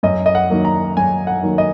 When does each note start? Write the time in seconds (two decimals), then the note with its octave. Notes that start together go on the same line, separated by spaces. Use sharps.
0.03 F#2 D#5
0.26 D#5
0.35 F#5
0.50 D#3 F#3 A#3
0.65 A#5
0.97 F#2 G#5
1.27 F#5
1.43 D#3 F#3 A#3
1.58 D#5